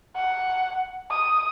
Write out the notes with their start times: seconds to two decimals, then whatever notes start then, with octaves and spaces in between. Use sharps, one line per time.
0.15 F#5
1.11 D#6